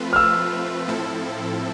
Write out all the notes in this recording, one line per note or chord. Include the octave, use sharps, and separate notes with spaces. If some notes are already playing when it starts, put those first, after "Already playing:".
Already playing: F3 A3 C4 F4 B4
F6
E6
A2 F3 C4 E4 A4